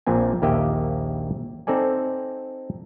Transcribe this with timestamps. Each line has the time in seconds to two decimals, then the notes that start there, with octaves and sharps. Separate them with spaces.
0.07 A#1 A#2 C4 G#5
0.42 A#1 D#2 A#3 G4 D#5 E5
1.67 C4 D#4 A4 D5 G#5